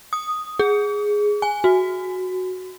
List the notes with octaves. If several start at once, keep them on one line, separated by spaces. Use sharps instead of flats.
D#6
G#4
G#5
F#4